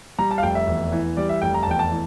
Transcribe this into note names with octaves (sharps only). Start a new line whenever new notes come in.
G3 A#5
A5
F5
F1 G5
E5
E2
E3
G3 D5
E5
F1 G5
A#5
A5
E2 G5
A5
E3